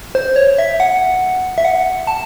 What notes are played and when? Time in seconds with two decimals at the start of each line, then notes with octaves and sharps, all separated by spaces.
0.15 C5
0.36 C#5
0.58 E5
0.80 F#5
1.58 E5
1.65 F#5
2.07 A5